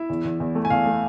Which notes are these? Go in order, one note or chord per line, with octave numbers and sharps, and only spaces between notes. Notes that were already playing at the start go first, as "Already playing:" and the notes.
Already playing: E4 E5
E2
E2
E2
A3
G#5
E2 F5
A3